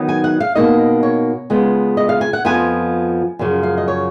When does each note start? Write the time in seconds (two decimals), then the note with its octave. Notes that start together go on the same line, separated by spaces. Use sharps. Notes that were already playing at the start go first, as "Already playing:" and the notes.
Already playing: D#3 F#3 B3 D#4
0.09 G#5
0.24 F#5
0.40 F5
0.55 B2 A#3 D#4 D#5
1.03 C#5
1.50 C#3 G#3 B3 F4
1.97 D#5
2.09 F5
2.21 G#5
2.33 F#5
2.45 F2 F3 B3 G#5
3.39 F#2 C#3 F3
3.63 F5
3.78 D#5
3.88 C#5